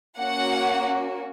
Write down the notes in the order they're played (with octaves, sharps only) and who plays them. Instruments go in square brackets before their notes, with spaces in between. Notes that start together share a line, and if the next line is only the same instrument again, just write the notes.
[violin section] A#3 C#4 F#4 F#5